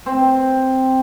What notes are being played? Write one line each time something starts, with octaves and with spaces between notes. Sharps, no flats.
C4